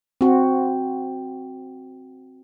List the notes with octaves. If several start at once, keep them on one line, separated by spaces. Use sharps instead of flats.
C4 F#4